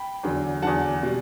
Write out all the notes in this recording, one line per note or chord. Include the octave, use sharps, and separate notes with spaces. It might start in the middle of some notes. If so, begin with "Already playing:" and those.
Already playing: G5 B5
E2 D3 F#3
E2 D3 F#3 F#5 A5
B2 G3